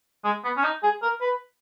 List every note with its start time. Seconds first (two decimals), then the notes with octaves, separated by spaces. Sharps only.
0.24 G#3
0.44 B3
0.57 C#4
0.63 D#4
0.83 G#4
1.02 A#4
1.21 B4